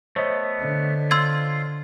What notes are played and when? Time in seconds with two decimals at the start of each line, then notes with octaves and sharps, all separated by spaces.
0.16 A3 B3 C5 C#5 D#5
0.60 D3
1.11 F4 C6 E6 G#6